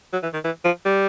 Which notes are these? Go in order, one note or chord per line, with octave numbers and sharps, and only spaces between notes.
F#3
E3
D#3
E3
F3
G3